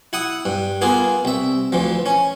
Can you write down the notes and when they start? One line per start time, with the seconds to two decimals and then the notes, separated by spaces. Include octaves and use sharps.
0.13 E4 F#5 D#6
0.46 G2
0.81 A#3 B3 F4 G#4
1.25 C2 E5
1.72 D2 E3 F3
2.06 C#4